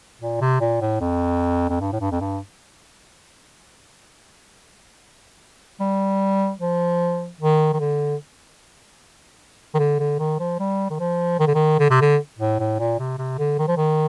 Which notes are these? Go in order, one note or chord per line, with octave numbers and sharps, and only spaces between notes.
A#2
C3
A#2
A2
F2
F2
G2
A2
G2
F2
G2
G3
F3
D#3
D#3
D3
D#3
D3
D3
D#3
F3
G3
D#3
F3
D#3
D3
D#3
D3
C3
D3
A2
A2
A#2
C3
C3
D3
D#3
F3
D#3